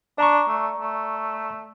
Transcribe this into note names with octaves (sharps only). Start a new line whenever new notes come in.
D4 D5 A#5 C#6
A3
A3